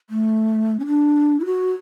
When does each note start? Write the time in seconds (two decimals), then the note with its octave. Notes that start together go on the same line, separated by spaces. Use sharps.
0.10 A3
0.79 C#4
0.87 D4
1.40 E4
1.45 F#4